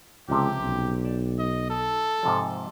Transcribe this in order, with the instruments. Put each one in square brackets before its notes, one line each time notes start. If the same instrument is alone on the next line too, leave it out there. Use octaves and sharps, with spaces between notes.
[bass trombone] C#2 [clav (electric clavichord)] C3 F3 [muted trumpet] G4
[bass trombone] B1
[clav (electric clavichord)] D5 A5
[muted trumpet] D#5
A4
[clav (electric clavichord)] G#2 C3 F3